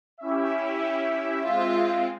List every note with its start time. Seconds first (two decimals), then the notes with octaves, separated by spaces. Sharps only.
0.21 C#4 E4 G4 E5
1.44 G#3 C4 F4